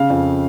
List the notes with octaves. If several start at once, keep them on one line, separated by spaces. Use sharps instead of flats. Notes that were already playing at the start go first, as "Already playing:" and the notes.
Already playing: C#3 F5
F2